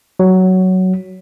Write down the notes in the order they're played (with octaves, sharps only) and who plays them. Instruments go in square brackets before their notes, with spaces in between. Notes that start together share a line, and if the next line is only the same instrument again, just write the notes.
[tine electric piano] F#3